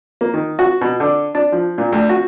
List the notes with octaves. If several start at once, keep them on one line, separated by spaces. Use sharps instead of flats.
A#3
D#3
F#4
B2
D3
D4
F3
A#2
D2
F#4